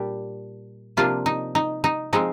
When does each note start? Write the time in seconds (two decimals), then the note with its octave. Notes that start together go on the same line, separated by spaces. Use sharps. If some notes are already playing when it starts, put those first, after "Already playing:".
Already playing: A#2 G3 D4 G4
0.97 C3 F3 A#3 D4 F4
1.26 D#4
1.55 D#4
1.84 D#4
2.13 F3 G#3 C4 D#4